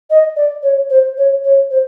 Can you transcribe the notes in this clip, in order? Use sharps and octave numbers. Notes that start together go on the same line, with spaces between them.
D#5
D5
C#5
C5
C#5
C#5
C5